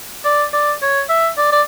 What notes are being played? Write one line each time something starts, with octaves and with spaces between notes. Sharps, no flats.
D5
D5
C#5
E5
D5
D5